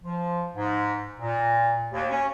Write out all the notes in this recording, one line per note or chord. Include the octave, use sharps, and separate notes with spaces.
F3
G#2
A#2
D#2
C#4